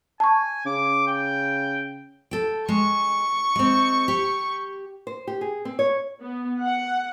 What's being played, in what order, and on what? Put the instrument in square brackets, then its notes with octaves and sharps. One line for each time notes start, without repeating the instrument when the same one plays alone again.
[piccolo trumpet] G#5 [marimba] A5 C#6
[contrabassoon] C#3 [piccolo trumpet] D6
[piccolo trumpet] G5
[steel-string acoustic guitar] A4 G5
[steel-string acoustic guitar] G#3 [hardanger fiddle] C#6
[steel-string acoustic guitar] G#3 C4
G4
[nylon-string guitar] C5
G4
G#4
C4
C#5
[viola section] B3
F#5